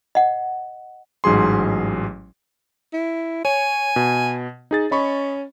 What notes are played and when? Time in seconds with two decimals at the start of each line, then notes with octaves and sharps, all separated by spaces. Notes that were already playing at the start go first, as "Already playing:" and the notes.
0.15 D#5 F#5
1.24 A1 G#2 F#3 G#4 C6
2.93 E4
3.45 C#5 G#5
3.96 B2
4.71 D#4 G#4 A6
4.91 C#4 D#5 B5 C#6